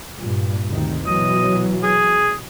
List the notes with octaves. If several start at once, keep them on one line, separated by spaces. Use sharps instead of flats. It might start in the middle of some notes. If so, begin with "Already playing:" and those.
G2 A#2
D2 C3 D#3
B2 E3 F#3 D#5
G#4